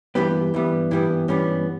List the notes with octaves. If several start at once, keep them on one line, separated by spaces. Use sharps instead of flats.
G2 E3 G3 B3 G4
G2 E3 G3 B3
G2 E3 G3 B3 E4
G2 E3 G3 B3 C#4